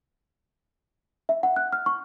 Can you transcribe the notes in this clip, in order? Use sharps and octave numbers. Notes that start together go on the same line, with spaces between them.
E5
F#5
F#6
F6
C#6